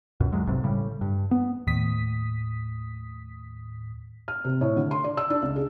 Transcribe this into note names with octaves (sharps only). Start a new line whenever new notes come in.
C#2 F#2 B2
D2 F#3 G#3
F#1 B1 G#2 C3
A2 C#3 G3
G2
B3
D#2 A2 D#6 B6
F6
C3
A2
D3
C6
D5
E6
D4
C#2
G#4